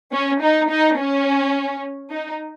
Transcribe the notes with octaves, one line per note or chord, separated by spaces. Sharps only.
C#4
D#4
D#4
C#4
D#4